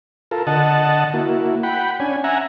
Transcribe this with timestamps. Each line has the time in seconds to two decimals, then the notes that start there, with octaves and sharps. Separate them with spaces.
0.31 F4 A4 A#4
0.47 D3 D#5 F#5 A5
1.14 A#3 E4 F#4
1.63 F#5 G5 B5
2.00 C#4 D4 G#5
2.24 E5 F#5 G#5 A#5